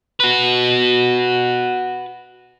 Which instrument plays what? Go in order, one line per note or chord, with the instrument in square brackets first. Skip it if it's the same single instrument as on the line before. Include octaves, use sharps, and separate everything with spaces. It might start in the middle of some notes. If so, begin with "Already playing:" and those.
[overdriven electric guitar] F#4 B4